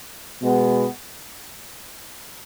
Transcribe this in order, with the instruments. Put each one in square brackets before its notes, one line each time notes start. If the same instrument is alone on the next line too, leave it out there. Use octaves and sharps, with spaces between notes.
[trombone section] B2 G#3 B3